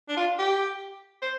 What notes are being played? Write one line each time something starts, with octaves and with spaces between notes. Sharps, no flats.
D4
F4
G4
C5